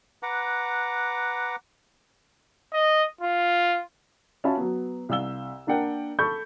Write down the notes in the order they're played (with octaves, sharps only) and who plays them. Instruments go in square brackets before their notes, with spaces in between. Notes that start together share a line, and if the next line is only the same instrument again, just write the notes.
[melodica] B4 F#5 A#5 D6
[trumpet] D#5
F4
[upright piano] C#4 F4 F#4 E5 A5 B5
F#3 B3
C2 F5 E6 G7
A#3 D4 A#4 F#5 G5
A4 B5 C#6 G6